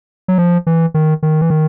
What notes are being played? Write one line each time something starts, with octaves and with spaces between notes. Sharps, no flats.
F#3
F3
E3
D#3
D#3
E3
D#3